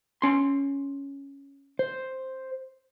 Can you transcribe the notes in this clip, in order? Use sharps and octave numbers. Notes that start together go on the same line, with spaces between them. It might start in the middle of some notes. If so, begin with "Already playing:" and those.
C#4 C6
C5